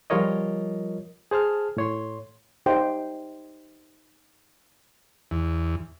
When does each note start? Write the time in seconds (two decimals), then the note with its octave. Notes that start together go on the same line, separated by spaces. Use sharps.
0.10 F3 G3 F4 A#4 C#5 D#5
1.31 G#4 C5 A5 F6
1.77 A2 C#5 C6
2.66 D#4 G4 C5 G5
5.31 E2